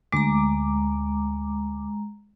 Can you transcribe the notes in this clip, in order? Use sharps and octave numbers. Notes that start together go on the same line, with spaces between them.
D2 G#3 A#5 D6